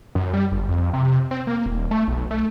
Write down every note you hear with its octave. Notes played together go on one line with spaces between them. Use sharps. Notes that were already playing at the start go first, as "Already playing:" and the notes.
F#2
G3
G1
F2
C3
C4
A#3
D#1
A3
B1
A3